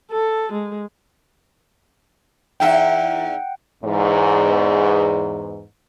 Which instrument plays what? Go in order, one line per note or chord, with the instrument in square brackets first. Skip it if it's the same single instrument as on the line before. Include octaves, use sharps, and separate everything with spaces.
[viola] A4
G#3
[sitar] E2 D#4 E5 [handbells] F#5 G5
[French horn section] E2 G#2